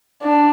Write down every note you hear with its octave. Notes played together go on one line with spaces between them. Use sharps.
D4